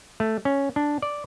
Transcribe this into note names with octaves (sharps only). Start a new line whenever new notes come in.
A3
C#4
D4
D5